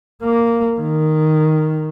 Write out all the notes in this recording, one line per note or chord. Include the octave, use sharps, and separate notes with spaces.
A#3
D#3